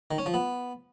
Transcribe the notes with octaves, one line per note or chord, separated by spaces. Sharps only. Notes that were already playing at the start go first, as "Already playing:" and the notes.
D#3
C#4
F3
B3